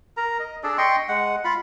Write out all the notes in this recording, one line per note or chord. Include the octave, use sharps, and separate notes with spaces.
A#4 A#5
D#5
D4 G#4 A4 D5
D#5 G5 C6 C#6
G#3 F#5
F4 B5